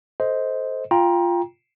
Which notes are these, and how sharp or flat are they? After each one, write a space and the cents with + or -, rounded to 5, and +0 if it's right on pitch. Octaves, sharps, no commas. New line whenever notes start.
A4 +0 C5 +0 D#5 +20
F4 -5 G5 +10 A#5 +25